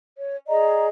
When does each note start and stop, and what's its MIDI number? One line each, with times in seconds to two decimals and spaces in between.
0.17 0.36 73
0.48 0.88 68
0.48 0.88 74
0.48 0.88 75
0.48 0.88 82